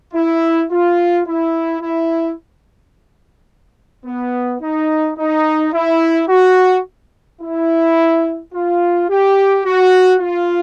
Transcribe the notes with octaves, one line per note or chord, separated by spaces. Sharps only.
E4
F4
E4
E4
B3
D#4
D#4
E4
F#4
E4
F4
G4
F#4
F4